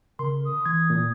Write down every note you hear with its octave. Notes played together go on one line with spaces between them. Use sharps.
C#3 A#4 C6
D#6
E3 G#6
A#2